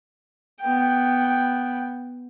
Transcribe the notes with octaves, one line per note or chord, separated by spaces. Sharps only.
B3 G5